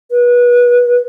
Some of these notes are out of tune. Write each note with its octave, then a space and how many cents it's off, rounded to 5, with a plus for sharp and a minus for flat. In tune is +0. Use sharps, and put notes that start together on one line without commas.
B4 -25